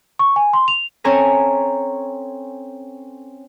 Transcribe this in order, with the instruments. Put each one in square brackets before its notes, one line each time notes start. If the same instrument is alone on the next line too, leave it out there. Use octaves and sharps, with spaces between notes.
[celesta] C#6
G#5
C6
F7
[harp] C4 C#4 A4 C#5 G#5 A#5